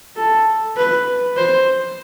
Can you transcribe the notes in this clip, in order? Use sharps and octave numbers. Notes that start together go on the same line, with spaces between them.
A4
B4
C5